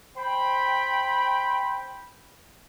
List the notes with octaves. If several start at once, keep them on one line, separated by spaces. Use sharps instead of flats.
C5 G5 B5